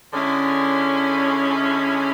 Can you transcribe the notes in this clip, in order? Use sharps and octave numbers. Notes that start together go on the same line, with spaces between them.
D3 G#3 C#4 E4